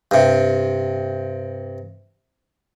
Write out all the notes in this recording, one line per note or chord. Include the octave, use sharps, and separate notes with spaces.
G2 C3